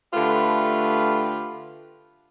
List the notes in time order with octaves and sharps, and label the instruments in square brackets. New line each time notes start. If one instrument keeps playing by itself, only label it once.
[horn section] D3 A3 F4 G4 B4